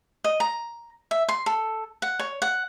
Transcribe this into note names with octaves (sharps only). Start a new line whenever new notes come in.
D#5
A#5
E5
C6
A4
F#5
C#5
F#5